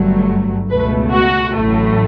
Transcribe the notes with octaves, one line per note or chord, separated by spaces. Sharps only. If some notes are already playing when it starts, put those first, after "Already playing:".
Already playing: G1 G2 F#3 A3
C#2 B2 A3 B4
F#4
A1 A2 F#3 A3